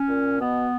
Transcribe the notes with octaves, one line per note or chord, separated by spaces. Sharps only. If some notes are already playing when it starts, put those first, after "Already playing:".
Already playing: C#4
A#2
B2 B3